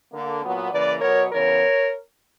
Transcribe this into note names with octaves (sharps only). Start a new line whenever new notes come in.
D3 A#3
A#2 F#3 B3
C#3 E3 A#3 B4 D5
B2 F#3 B3 A#4 C#5
C#3 E3 B3 A#4 C#5